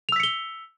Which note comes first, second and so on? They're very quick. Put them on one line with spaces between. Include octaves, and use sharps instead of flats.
F7 E6 B6 C#7 G7